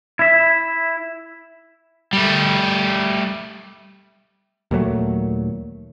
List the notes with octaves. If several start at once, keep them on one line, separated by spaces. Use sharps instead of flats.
E4 E5
G3 A3
D#2 A#2 F#3 A3